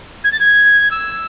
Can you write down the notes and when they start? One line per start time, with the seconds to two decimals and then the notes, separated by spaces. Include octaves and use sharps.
0.24 G#6
0.32 A6
0.39 G#6
0.91 E6